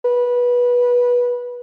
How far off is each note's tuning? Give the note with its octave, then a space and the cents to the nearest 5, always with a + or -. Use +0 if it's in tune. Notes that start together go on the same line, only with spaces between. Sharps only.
B4 -20